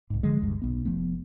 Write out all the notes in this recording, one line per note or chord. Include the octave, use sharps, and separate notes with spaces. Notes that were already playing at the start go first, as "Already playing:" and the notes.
C2 G#2
D3 F3 G#3
F1 D2 G2
B1 B3
F1 F3 A3 B3